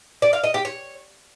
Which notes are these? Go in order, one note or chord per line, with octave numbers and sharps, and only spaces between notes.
D5
F5
D#5
G4
C#5